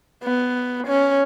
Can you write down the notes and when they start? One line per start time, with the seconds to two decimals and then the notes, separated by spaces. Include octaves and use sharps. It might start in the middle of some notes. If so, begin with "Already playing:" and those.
0.24 B3
0.87 C#4